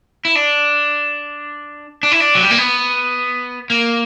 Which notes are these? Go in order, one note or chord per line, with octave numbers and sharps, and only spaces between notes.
E4
D4
D4
E4
D4
F#3
G3
A#3
B3
A#3